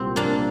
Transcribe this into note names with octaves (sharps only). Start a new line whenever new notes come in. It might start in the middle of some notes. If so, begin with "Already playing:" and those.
Already playing: C2 A#2 G3 C4
A#3 D4